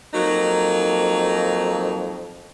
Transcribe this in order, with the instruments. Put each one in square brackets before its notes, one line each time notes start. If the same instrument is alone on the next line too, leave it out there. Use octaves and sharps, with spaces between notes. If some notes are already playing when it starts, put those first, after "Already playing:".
[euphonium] F2 [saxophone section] F#3 A#3 D#4